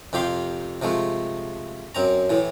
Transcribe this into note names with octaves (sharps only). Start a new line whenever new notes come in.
F2 C3 G4 F5 C6
C3 F3 G#3 A3
F#2 C4 A#5
A2 E3